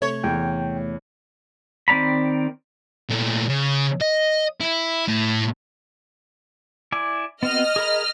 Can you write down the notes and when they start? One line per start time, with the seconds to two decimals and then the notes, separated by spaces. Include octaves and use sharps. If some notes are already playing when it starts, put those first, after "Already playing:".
0.02 C3 A3 C#5
0.24 E2 G5
1.88 D#3 C4 D5 A#5 B5
3.10 A#2 A3
3.49 C#3
4.01 D#5
4.60 E4
5.08 A2
6.92 E4 D5 G#5
7.43 B3 C4 F#4 D#5 F6
7.76 G#4 A#4 B5